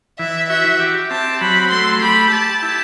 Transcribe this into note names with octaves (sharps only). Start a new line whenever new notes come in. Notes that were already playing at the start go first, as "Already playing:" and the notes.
E3 E5
F#4 E5
G4
C4 A5
F#3 B5
A3 C6
G4 B5
G4 A5
E4